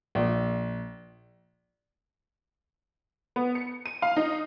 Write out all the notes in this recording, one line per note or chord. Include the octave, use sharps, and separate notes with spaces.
A#1
B3
C#7
D#7
F5
D#4